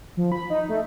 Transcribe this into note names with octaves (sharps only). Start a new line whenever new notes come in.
F3
B5
D#4
A3